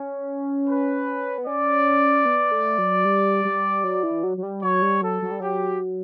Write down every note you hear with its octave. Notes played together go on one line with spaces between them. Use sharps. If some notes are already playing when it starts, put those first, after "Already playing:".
Already playing: C#4
B4
B3
C#4 D5
B3
A3
F#3
G3
G3
F#3
E3
F#3
F#3
G3
F#3 C#5
G3
F#3 A4
F#3
G3
F#3 G4